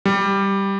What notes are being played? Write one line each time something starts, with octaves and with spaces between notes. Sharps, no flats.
G3